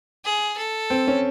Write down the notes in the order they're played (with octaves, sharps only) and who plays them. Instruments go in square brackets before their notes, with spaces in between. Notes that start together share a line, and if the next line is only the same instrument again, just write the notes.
[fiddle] G#4
A4
[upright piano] C4
C#4